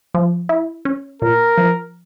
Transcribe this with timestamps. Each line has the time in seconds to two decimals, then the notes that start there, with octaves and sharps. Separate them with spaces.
0.14 F3
0.49 E4
0.85 C#4
1.22 A#2 A#4
1.57 F3